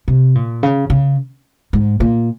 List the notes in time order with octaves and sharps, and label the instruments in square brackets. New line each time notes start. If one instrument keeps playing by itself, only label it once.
[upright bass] C3
A#2
C#3
C#3
G#2
A#2